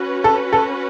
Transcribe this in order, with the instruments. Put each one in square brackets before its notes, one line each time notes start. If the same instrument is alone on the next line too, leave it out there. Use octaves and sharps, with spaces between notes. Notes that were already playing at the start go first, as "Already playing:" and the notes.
Already playing: [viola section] C#4 F#4 B4
[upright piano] A4
A4